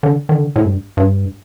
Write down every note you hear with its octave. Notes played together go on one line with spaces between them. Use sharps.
D3
D#3
D3
A2
G2
G2